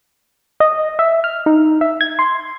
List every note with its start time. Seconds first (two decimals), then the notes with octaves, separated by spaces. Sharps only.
0.60 D#5
0.99 E5
1.24 F6
1.46 D#4
1.81 E5
2.01 G#6
2.19 C6